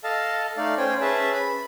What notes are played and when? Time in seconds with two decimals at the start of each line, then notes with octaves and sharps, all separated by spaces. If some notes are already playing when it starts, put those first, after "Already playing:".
0.04 A4 D#5 F5 A5
0.57 A3 D#4 D5 F5
0.78 C#4 C5 G5 G#5
1.01 C#4 G#4 B4 E5 A5
1.34 B5